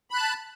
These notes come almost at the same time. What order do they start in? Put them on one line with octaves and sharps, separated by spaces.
B5 F#6 A5